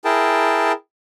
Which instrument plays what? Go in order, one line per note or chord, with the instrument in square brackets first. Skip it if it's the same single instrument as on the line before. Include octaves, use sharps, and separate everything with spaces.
[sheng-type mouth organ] E4 G#4 A#4 G5 A5